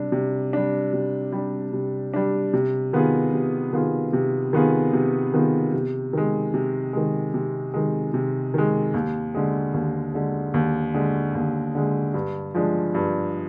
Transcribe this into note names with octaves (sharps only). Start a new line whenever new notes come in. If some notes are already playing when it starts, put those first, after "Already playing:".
Already playing: C3 G3 D4
C3
G3 D4
C3
G3 D4
C3
G3 D4
C3
D#3 B3 F4 G#4
C3
D#3 B3 F4 G#4
C3
D#3 B3 F4 G#4
C3
D#3 B3 F4 G#4
C3
D#3 G#3
C3
D#3 G#3
C3
D#3 G#3
C3
D#3 G#3
D#2
D3 G#3
D#2
D3 G#3
D#2
D3 G#3
D#2
D3 G#3
G2
F3 G#3 D4
G2